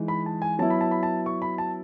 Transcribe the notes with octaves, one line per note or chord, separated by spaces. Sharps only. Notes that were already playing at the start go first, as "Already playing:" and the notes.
Already playing: E3 G#3 D#4
B5
A5
G#5
F#3 B3 E4 A5
B5
A5
B5
A5
C#6
B5
A5